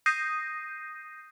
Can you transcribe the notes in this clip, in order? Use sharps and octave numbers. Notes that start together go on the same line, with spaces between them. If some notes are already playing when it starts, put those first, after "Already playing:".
D#6 G6 A#6 C7 D#7